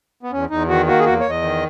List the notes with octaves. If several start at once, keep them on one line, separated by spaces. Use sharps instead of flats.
B3
E2 C#4
E2 D#4
D#3 F#4
A#3 F#4
G#4
E2 F#4
E2 C#5
D#5
D#3